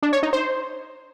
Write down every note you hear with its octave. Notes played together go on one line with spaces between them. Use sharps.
D4
C#5
D#4
C5